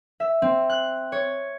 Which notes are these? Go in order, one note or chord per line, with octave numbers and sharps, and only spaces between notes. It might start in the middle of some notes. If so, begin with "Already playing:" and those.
E5
C4
F#6
C#5